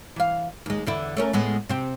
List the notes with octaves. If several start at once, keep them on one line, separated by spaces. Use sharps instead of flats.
E3 F5
D#2 G#3
E2 D3 E4
A3 C#4 A#4
A2 G#3 B3
C3 C4